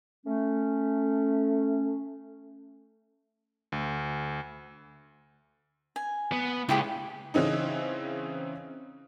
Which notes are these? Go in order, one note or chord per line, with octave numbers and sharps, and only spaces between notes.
A3 C#4
D2
G#5
B3
C#2 E4 G4 G#4
C#3 E3 C4 C#4 D#4